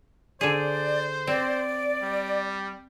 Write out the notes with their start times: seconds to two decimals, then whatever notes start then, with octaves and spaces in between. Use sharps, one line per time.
0.41 D3 G#4 C5 D5
1.27 C4 D5
2.02 G3